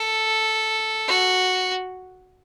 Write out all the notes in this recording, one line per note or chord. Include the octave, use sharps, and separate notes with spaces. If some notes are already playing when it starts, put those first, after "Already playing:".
Already playing: A4
F#4